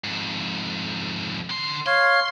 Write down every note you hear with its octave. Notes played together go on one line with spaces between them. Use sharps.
F2 G#2
D3 C6
C#5 F5 C6